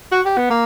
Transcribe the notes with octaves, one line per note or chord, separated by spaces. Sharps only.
F#4
G4
B3
A#3